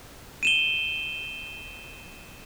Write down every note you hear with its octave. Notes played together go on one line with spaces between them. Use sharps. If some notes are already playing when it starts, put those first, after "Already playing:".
D#7 E7 G7